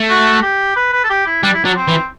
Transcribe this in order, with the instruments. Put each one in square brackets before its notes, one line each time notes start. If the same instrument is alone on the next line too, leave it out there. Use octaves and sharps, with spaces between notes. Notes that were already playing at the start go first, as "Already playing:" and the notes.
Already playing: [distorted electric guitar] A3
[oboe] F#4
G4
B4
B4
A4
G4
E4
[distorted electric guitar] G3 [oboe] D4
[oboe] E4
[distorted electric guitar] F#3 [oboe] D4
[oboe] C4
[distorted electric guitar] E3